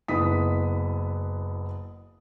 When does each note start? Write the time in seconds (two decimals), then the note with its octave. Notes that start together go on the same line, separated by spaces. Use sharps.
0.08 F#1 B3 E4 D#6 B6